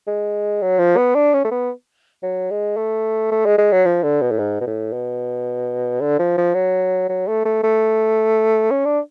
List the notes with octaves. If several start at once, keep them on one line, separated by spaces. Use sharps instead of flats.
G#3
F#3
F3
B3
D4
C#4
A3
B3
F#3
G#3
A3
A3
G#3
G#3
F#3
F3
D3
B2
A2
G#2
B2
A2
B2
D3
F3
F3
F#3
F#3
A3
A3
A3
C#4
D4